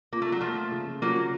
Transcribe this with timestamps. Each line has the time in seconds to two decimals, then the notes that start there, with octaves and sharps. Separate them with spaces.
0.12 A#3 F4
0.22 A3
0.32 F#3
0.41 F3 A3 A#3
0.72 C#3
1.02 F3 F#3 A#3